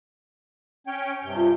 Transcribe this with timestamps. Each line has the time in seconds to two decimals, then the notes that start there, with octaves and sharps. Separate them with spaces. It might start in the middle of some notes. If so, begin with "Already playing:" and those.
0.87 C#4 C#5 G5
1.23 G2 C3 G6
1.36 F4